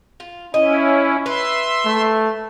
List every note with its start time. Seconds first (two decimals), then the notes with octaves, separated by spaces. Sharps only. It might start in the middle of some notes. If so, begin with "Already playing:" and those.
0.20 F4
0.54 C#4 E4 D#5
1.26 B4 E5 C6
1.85 A3